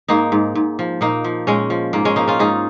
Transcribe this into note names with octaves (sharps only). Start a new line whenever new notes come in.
G#2 A#3 D#4
G#2
G#2
F3
A#2 A#3 D#4
F3
A#2 G#3 C#4
F3
G#2 A#3
G#3 C#4
F3 A#3 D#4
C#4 F4
G#2 D#4 G#4